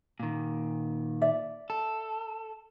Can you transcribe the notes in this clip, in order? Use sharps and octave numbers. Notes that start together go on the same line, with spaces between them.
A#2 D#3
D5 E5
A4